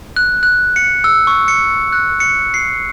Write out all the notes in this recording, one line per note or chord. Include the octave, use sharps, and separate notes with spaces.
F#6
F#6
C#7
E6
C#6
C#7
F#6
C#7
C7